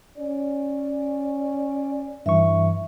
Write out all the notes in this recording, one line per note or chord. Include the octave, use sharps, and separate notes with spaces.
C#4 D5
G2 E3 E5 C#6